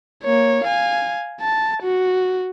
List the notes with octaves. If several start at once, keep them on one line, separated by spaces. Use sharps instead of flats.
A#3 C#5
F5 G#5
A5
F#4